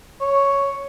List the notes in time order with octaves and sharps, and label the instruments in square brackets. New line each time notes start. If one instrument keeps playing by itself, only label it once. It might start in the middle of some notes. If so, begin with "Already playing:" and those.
[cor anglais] C#5